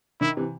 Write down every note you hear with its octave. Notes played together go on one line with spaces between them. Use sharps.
D#3 E4
C3 E3